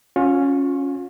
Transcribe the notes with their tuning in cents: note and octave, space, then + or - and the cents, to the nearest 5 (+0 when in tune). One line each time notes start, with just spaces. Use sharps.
C#4 +0 F4 +35